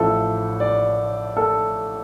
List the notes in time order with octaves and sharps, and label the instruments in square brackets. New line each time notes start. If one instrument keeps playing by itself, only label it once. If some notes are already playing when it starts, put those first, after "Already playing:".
Already playing: [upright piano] A1 A2 F3 A4
D5
A4